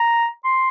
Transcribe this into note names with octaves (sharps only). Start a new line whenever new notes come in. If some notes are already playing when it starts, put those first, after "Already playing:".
Already playing: A#5
C6